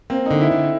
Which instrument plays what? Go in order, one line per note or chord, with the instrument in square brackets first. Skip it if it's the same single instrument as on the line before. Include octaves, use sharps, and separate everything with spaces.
[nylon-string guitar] A#3 [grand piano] C4
[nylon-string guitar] D3 [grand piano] D#4
[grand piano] E4
[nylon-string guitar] D3